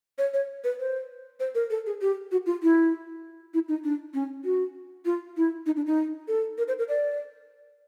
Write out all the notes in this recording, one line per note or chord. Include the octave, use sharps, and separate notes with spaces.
C#5
C#5
B4
C5
C5
A#4
A4
G#4
G4
F#4
F4
E4
E4
D#4
D4
C#4
F#4
F4
E4
D#4
D4
D#4
A4
A#4
C5
A#4
D5